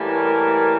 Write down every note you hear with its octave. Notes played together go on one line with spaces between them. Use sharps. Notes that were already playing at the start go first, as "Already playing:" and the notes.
Already playing: A2 E3 G3 A#3
A#4